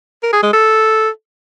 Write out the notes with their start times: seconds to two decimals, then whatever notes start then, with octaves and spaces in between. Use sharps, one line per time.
0.23 A#4
0.33 G#4
0.43 G#3
0.53 A4